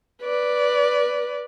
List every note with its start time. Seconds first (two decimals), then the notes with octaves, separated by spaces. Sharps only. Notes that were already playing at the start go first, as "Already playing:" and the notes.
0.22 B4 D5